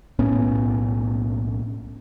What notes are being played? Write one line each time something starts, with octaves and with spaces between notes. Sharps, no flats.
B1 A2 B3 C#4